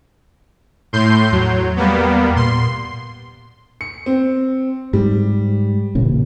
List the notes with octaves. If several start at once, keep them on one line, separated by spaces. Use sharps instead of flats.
A2 C6 G6
E2 F#3
G3 A#3 B3
A#2 C6
C#7
C4
G#2 G3
A1 A#2 C#3